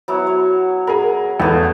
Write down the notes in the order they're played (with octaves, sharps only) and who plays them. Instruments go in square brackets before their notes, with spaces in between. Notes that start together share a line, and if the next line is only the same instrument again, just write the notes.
[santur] F#3 B3 E4
C#5
[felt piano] G#4 A#4 [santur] B5
[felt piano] E2 [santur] A3 B3